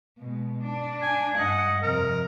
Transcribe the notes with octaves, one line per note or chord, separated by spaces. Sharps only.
B2 G#3
D4
G#5
G2 D#5 F#5
F2 C3 A#4